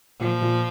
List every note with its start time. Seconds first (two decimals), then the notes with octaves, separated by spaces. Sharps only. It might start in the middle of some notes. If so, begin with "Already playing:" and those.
0.20 A#2 F3
0.41 A#2